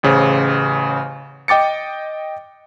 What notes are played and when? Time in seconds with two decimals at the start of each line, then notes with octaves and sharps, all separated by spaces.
0.03 A1 C#3 C5
1.48 D#5 G5 D6 A6 C#7